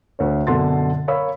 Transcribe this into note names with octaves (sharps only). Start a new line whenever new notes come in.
D2 C#5
F#2 B2 D3 C6 A6
A#4 C#5 F5 B5 E6